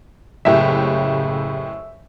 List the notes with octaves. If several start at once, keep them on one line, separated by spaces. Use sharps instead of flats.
F#1 A2 C#3 G4 E5